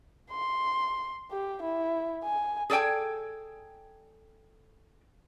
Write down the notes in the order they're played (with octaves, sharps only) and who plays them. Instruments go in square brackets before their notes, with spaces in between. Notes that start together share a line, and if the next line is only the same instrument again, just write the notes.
[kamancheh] C6
G4
E4
G#5
[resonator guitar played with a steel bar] G#4 A4 D5 G5 G#5